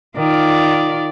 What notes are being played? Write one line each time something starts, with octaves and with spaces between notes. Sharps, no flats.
D#3 F4 D5